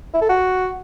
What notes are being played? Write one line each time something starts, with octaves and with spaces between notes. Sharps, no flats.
E4
A4
F#4